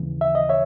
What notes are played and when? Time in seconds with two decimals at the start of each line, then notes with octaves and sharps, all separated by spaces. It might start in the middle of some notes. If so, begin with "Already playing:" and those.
Already playing: D#2 C#3 E3
0.21 E5
0.35 D#5
0.49 C#5 E5